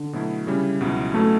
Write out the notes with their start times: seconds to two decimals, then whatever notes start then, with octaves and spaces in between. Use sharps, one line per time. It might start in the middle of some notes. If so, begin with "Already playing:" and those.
Already playing: D3
0.13 B2 F#3 A3 E4
0.47 C#3 G3 C#4 E4
0.81 C#2 B2 F#3 C#4 E4
1.14 B2 F#3 A3 C#4 E4